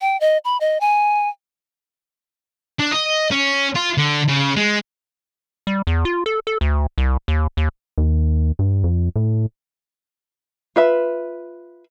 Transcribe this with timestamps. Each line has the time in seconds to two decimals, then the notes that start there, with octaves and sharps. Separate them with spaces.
0.01 G5
0.20 D#5
0.45 B5
0.61 D#5
0.80 G#5
2.79 D4
2.91 D#5
3.31 C#4
3.75 F4
3.98 D3
4.28 C#3
4.56 G#3
5.67 G3
5.87 E2
6.05 F4
6.26 A4
6.47 A4
6.61 D2
6.98 C2
7.28 D#2
7.57 D#2
7.98 D#2
8.59 G2
8.84 F2
9.16 A2
10.76 F4 B4 E5